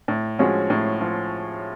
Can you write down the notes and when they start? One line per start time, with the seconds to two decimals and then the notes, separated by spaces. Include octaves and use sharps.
0.08 A2
0.39 F3 G#3 C#4 F#4
0.70 A2
1.01 F3